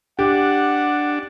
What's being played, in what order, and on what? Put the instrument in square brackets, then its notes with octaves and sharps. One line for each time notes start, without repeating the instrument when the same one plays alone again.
[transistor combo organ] D4 [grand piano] G4 [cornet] F#5